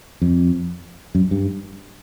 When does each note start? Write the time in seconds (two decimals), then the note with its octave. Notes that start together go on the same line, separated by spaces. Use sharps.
0.22 F2
1.15 F#2
1.31 G2